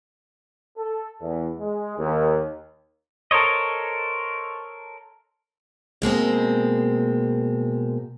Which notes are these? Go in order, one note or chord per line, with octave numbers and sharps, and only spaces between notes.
A4
E2
G#3
D#2
A4 A#4 C5 C#5 D#5
B2 G#3 A#3 C4